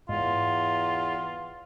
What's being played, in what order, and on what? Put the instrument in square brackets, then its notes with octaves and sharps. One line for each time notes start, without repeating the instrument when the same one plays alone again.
[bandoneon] E2 [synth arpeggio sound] G#2 [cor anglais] F4